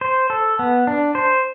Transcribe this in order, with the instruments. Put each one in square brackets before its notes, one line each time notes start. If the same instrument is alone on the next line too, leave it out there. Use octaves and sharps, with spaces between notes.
[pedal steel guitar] C5
A4
B3
D4
C5